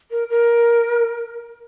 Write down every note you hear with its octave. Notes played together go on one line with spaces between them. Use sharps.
A#4
A#4